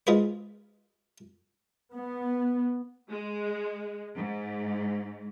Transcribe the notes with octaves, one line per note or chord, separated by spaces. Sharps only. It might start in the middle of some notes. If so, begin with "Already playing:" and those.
G#3 F4 G#4 B4 C5
B3
G#3
G#2